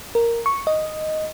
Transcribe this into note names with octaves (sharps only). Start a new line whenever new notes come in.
A#4
C#6
D#5